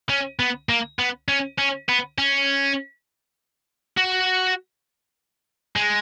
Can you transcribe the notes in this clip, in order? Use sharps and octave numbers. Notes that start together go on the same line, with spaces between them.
C#4
B3
A#3
B3
C#4
C#4
B3
C#4
F#4
G#3